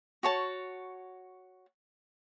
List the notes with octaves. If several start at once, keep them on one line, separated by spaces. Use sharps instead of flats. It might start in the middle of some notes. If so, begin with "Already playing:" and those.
F#4 C#5 A5